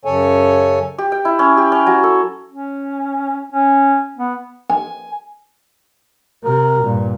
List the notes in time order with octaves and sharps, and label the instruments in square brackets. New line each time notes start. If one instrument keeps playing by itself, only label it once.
[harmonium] F#2 C#3 A4 C#5 G#5
[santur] G4
G5
E4
C#4
G4
C#4
F#3
A4
[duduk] C#4
C#4
B3
[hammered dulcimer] G#5
[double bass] C3 [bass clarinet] A#4
[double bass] G2 A#2